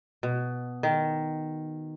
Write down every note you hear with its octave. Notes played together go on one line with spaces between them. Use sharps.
B2
D#3